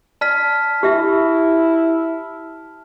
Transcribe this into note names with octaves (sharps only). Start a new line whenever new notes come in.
D5 A5 F6 B6
E4 G4 E5